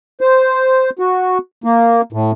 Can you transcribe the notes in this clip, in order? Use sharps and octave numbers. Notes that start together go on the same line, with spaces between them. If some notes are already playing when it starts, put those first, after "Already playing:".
C5
F#4
A#3
A2